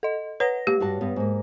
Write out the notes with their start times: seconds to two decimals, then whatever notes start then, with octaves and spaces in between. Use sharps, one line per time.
0.03 A4 D#5
0.40 B4 C#5 F#5 A#6
0.67 A#3 G4
0.80 G2 F#4 A5
1.01 G2 B3
1.16 G#2 A#3